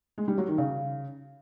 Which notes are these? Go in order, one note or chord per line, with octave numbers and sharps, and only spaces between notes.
G#3
G3
F#3
D#3
C#3